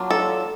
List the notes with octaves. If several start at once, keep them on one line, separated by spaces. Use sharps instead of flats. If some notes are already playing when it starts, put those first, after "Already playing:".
Already playing: F#3 A#3 D4 F4
A4